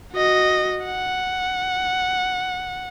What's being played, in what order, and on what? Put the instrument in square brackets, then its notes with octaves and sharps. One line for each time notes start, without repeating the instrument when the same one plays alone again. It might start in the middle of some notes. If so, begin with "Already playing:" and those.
[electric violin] F#4 D#5
F#5